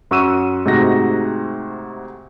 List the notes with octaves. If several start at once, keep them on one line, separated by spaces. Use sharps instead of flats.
F#2 F#4 C#6 E6 D#7 E7
G#2 C3 A3 D#4 F#4 A#6